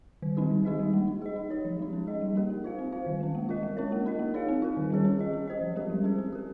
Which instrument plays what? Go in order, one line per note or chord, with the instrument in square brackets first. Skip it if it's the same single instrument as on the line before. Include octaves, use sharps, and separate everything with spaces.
[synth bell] D#3
G3 C4 D#4 G4
D#3
G#3 D#4 G#4 D#5
G3
A#3 D#4
D#4
G#4 D#5
D#4
G4 C#5
F3
G#3 D#4
C#4
G#4 D#5
G3
A#3 D#4 G4 A#4
A#3
F4 C5 F5
C4
F4 C5 F5
D#3
G#3 C#4
A#3
F4 A#4 D#5
G#3
C#4 F4 A#4 C#5
A#3
D#4 A#4 D#5
A#3
D#4 G#4 C#5 F5
C4
F4 A#4
D#3
G3 C#4 G#4 C#5
C#4
G#4 D#5
C#4
G4 C5 D#5
F3
G#3 C#4 G4 A#4
G3
C#4 G#4 C5
C4
G4 A#4